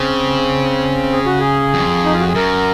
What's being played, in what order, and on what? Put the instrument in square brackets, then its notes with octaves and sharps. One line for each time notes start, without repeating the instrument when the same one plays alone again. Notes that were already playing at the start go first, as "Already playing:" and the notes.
Already playing: [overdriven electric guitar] C#3 [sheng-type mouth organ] C4
[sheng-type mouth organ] G#4
F#4
G#4
[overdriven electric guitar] F2
[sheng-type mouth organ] D#4
F4
F#4
G#4
[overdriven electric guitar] F#2 [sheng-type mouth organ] A#4